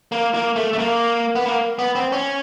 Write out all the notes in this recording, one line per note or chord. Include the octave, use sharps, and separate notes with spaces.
A#3
A#3
A3
A3
A#3
B3
A#3
B3
C4
C#4